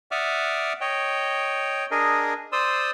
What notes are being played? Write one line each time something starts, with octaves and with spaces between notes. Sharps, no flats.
D5 E5 F#5 D6 D#6 F6
C#5 D#5 G5
D4 G#4 A#4 D#5
C5 D5 C6 D#6 E6